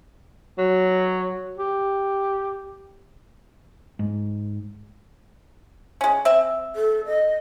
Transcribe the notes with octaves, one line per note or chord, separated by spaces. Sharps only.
F#3
G4
G#2
G#3 C#4
C4 E5
A4
D#5